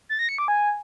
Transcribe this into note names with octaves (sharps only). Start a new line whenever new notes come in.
A6
A#6
C#7
D6
G#5